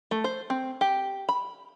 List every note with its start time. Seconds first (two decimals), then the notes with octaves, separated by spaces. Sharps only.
0.11 A3
0.24 C5
0.50 C4
0.81 G4
1.29 B5